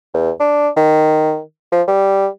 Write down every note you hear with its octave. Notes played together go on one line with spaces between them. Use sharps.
E2
D4
D#3
F3
G3